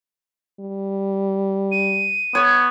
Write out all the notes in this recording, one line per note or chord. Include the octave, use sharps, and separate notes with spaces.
G3
D#7
B3 C#5